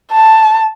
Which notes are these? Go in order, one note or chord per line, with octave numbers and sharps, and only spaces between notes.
A5